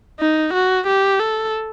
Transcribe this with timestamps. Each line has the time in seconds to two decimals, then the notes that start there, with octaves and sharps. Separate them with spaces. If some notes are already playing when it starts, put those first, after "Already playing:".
0.20 D#4
0.54 F#4
0.87 G4
1.20 A4